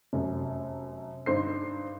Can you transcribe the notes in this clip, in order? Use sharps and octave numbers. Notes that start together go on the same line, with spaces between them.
F1 F#2
G2 D#4 C5 C7